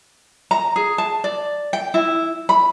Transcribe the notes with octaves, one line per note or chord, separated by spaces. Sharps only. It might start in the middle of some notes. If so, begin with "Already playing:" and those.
A#5
G#4
A5
D5
G5
E4
B5